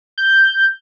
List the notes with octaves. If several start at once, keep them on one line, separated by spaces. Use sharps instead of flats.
G6